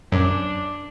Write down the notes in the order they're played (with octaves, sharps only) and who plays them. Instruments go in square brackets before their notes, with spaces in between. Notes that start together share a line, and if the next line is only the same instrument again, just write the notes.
[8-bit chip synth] F#2 [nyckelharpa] D4